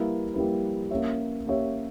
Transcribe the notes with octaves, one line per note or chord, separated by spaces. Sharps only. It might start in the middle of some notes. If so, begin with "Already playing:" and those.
Already playing: G3 A#3 E4 B4
G3 A#3 E4 B4
A#3 C#4 G4 C#5 E5
A#3 C#4 G4 C#5 E5